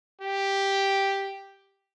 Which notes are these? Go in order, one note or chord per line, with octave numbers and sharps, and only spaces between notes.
G4